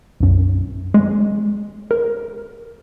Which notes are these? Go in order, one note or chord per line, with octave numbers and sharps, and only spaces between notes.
B1 F#2
G#3
A#4